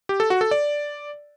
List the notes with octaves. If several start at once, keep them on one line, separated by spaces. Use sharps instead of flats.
G4
A4
F#4
A4
D5